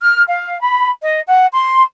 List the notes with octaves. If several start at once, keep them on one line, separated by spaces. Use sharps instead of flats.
F6
F5
B5
D#5
F#5
C6